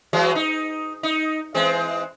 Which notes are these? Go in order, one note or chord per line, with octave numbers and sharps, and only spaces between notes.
E3 F#3 G#3
D#4
D#4
E3 G#3 C4